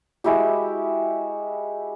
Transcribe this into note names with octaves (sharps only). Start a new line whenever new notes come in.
G#3 E4 F#4 G4